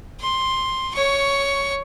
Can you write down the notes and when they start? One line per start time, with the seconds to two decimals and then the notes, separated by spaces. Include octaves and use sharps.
0.20 C6
0.94 C#5 C#6